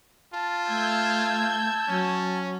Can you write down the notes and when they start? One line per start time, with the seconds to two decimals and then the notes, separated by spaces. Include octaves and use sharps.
0.34 F4 A5
0.69 A3 E6 G6 G#6
1.88 F#3 C#4